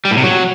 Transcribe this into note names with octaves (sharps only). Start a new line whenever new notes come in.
G3
A2
C3
F#3